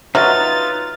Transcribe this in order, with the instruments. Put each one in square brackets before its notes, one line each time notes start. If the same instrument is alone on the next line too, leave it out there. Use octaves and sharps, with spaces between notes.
[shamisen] F#3 [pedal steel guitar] D#4 F4 [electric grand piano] B4 E5 F6 [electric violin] A6